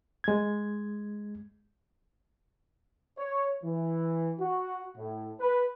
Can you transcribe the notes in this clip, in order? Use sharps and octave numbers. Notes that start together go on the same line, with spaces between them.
G#3 G#6
C#5
E3
F#4
A2
B4